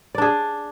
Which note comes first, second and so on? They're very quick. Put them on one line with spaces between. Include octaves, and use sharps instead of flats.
D5 D4 G#4